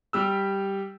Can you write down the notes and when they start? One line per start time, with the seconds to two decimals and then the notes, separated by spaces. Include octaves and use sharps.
0.13 G3 G4 E6